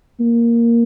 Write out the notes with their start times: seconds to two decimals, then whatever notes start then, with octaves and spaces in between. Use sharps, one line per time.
0.20 A#3